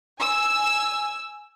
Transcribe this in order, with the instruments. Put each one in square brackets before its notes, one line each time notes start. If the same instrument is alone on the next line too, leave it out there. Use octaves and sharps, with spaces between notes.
[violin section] G#5 E6